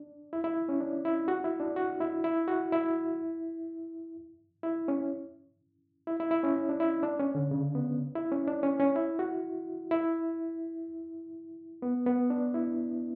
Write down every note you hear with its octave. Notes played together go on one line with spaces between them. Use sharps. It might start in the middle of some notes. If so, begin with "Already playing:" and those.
Already playing: D4
E4
E4
C#4
D4
E4
F#4
E4
D4
F#4
E4
E4
F#4
E4
E4
C#4
E4
E4
E4
C#4
D4
E4
D4
C#4
D3
C#3
B3
E4
C#4
D4
C#4
C#4
E4
F#4
E4
B3
B3
D4
E4